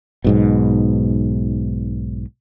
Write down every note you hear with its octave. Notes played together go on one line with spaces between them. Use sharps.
B1 G#2 B2